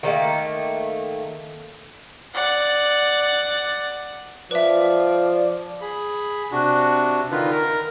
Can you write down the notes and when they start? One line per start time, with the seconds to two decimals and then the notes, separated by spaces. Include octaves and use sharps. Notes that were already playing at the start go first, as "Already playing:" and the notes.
0.03 D#3 G3 A3 A#3
2.34 D5 F#5
4.51 F3 B4 D5 E5
5.81 G#4 B5
6.52 C3 D4 F#4
7.31 D3 D#3 D#4 F4 B4
7.52 A#4